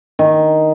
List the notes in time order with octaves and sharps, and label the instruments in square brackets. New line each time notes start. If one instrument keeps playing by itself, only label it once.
[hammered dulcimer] D#3